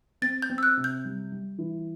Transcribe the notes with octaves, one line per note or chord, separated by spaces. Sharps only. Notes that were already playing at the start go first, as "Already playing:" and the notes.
C4 A6
G6
C4
E6
F#6
C3
G6
G3
G3
E3